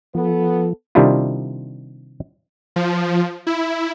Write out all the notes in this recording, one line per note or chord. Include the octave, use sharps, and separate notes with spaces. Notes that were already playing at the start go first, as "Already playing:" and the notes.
F3 B3 A4
C3 D#3 G3 D4 E4 F4
F3
E4